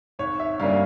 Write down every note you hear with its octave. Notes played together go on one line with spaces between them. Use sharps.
G#1 C#5
E5
G2 G3 A#3 C#4 F5